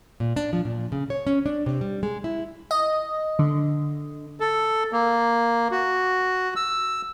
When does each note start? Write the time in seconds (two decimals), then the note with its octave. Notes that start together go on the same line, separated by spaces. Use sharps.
0.20 A#2
0.36 D4
0.53 F3
0.65 A#2
0.92 C#3
1.10 C#5
1.27 C#4
1.46 D4
1.66 C3
1.81 G3
2.03 G#3
2.24 E4
2.71 D#5
3.39 D3
4.40 A4
4.92 A#3
5.71 F#4
6.56 E6